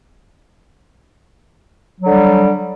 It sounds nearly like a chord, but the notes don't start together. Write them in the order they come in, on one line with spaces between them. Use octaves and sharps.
F#3 D3 G3